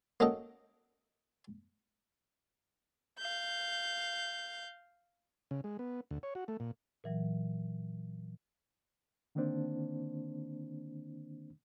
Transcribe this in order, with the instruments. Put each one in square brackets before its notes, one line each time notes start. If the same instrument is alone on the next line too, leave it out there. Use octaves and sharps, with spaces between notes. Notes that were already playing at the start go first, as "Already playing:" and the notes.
[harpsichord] A#3 C#4 F#4 A4 D#5 G5
[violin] F5 G6
[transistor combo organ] C#3
G#3
B3
D2
C#5
F#4
A3
A#2
[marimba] A#2 E3 F#3
[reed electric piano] D3 D#3 A#3 C4 D4 C5